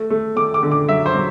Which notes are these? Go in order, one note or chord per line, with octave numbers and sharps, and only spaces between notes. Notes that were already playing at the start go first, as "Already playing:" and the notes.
Already playing: A3
A3
A3 D6
D6
D3
D6
F#3 E5
C5
F#3